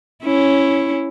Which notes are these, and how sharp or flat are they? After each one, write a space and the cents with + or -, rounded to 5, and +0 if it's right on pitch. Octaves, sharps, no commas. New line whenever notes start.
C#4 -5 E4 +0